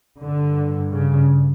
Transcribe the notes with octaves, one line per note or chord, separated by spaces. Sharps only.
G2 D3
C#3